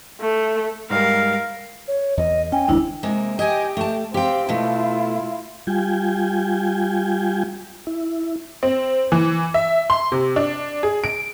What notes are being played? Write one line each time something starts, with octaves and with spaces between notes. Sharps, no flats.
A3
G#2 G3 A#4 F5
C#5
E2 D#5
C#4 G5 G#5
F1 D#2 G#3 D4 E4
C3 G#3 A#3
G4 D#5 G5 G#5
A3 A5
C4 G4 F5 G5
B2 A3 E4 F4
G3 F4 G5 G#5
E4
C4
E3
E5
C6
C3
D4
G#4
D7